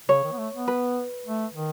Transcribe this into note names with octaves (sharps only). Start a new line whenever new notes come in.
C#3 C#5
D#3
B3
A3
B3
B4
A3
D#3